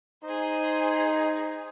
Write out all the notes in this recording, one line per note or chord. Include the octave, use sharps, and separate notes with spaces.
D#4 G#4 C5